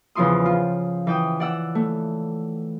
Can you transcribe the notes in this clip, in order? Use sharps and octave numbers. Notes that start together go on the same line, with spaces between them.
E2 C#3 F3 E4 C6 D#6
F4
E3 G5 D#6
D5 F#5 E6
A3